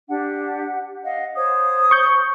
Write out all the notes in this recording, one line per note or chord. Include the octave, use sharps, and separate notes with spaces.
D4 G4 F#5
D#5 F5 F#5
C5 C#5 D#6
C#6 G6